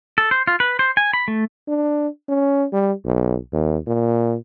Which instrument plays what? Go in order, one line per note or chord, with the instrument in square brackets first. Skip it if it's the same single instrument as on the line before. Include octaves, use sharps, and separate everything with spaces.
[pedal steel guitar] A4
C5
F4
B4
C5
G#5
B5
A3
[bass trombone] D4
C#4
G3
B1
D#2
A#2